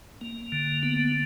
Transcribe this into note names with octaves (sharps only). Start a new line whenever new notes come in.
A#3
D3
B3